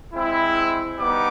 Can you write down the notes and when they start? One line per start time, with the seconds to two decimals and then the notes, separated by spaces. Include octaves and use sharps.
0.14 G#3 C4 E4
0.99 G3 B3 D#4 D6